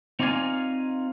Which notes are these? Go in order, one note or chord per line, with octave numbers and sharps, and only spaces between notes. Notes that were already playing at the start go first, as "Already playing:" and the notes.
C4 D#4 F4 D5 F5 G#5